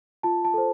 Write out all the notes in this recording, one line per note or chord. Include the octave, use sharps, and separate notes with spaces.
F4 A5
A5
A4 C5